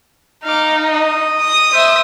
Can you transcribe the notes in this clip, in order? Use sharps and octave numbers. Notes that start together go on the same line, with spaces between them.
D#4 F5 D6
D#5
D#6
C5 E5